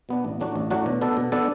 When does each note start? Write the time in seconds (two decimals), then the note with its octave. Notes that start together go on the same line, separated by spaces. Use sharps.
0.09 B2 B3 D4
0.25 A1
0.40 A2 F#3 D4 F#4
0.55 A1
0.70 A2 F#3 D4 F#4
0.86 B2
1.01 B3 D4 A4
1.17 B2
1.32 B3 D4 A4